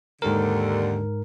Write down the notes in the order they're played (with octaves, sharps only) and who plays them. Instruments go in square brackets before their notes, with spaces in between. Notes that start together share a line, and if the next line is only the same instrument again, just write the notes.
[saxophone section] D#2 D3 [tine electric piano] G#2 A#4